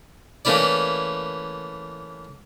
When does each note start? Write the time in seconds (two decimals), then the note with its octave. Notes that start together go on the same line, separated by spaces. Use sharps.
0.45 E3 A3 A#3 C#4 E4 D5